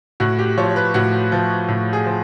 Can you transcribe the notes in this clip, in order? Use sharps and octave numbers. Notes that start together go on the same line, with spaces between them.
A2 F#4
G4
F3 C#5
B4
A2 F#4
F3
A2
G#4
F3